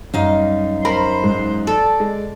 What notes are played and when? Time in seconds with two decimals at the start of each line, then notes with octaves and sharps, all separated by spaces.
0.14 F#2 G3 D#4 F5
0.85 A#4 C5 B5
1.24 G#2
1.67 A4 D5
2.00 G#3